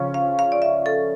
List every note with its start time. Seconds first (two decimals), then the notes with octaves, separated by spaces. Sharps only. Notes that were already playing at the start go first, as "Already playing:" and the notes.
Already playing: C#3 F3 C#4 F4
0.14 F5
0.39 F5
0.52 D5
0.62 E5
0.86 A4